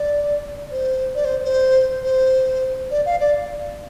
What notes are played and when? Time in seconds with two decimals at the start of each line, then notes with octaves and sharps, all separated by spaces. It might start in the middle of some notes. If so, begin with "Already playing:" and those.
Already playing: D5
0.72 C5
1.15 D5
1.25 C5
1.44 C5
2.03 C5
2.91 D5
3.06 F5
3.20 D5